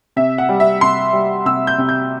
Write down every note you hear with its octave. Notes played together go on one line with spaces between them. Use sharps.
C3 E5
F#5
G3
E5
C3 C6
G3
C3 E6
G6
C3
G6